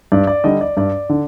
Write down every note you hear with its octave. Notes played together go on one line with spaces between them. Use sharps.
G2 D5
D5
D3 G3 D#5
D5
G2 D5
D3